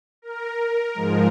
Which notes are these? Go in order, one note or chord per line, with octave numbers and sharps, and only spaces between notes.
A#4
G#2 F3 G#3